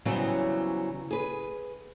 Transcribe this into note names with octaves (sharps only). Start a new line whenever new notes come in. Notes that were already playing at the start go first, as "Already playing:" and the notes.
C#3 E3 F#3 G3 B3 C4
G#4 B4